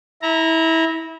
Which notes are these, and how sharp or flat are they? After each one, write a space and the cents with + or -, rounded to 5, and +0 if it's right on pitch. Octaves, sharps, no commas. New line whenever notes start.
E4 -25 A#5 +0